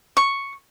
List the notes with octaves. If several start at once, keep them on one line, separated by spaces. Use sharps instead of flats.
C#6